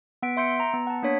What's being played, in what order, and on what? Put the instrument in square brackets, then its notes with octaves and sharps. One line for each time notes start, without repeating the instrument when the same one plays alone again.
[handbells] B3 F#5 B6 D7
E5 C6 G6 C#7 D7
A#5
B3
F#5 A5
A#3 D4 C#5 B6